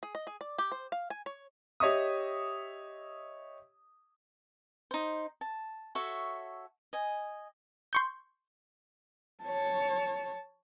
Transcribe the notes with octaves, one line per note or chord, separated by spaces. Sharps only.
G#4
D#5
G#4
D5
G4
C5
F5
G#5
C#5
G4 C#5 D#5 E5 C#6 D#6
D#4 C5
A5
F#4 A4 C#5 E5
D#5 G#5
C6 C#6 G6
C#5 A5